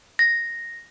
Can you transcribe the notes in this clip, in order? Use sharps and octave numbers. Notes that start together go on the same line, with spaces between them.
A#6